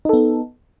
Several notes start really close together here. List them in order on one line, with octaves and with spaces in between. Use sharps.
D#4 A4 B3